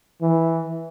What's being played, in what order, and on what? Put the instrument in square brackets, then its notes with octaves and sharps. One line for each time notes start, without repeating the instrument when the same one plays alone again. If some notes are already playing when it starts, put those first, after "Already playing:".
[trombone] E3